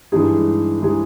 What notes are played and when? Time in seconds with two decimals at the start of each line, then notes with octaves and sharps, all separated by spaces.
0.12 G2 E3 G#3 D#4 G#4
0.81 E3 G#3 D#4 G#4